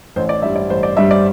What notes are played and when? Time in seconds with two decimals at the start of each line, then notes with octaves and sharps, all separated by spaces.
0.16 A1 C5
0.29 D5
0.42 G2 G3 E5
0.56 D5
0.69 A1 C5
0.83 D5
0.97 G2 G3 E5
1.11 D5